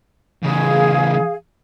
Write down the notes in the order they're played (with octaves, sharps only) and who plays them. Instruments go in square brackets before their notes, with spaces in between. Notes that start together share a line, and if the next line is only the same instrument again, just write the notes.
[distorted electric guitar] E2 C#3 [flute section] G#4 F5